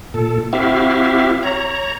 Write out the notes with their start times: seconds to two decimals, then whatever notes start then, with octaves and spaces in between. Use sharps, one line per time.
0.14 A#2 A4
0.53 C4 E4 F#4 G4 E5 F5
1.43 C#5 A#5